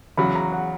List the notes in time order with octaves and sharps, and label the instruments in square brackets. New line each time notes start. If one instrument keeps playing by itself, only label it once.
[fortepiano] E2 C#3 F#3 [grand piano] B5
[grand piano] A#5
F#5